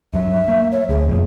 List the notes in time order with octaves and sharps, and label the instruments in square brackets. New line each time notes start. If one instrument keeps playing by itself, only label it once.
[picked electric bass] G2 F#3 [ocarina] E5
[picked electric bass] A#3
[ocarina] C#5
[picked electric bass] D2 [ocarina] G#4
[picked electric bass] F#1 F2 A#2